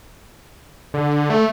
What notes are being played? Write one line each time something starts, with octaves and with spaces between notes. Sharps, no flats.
D3
A3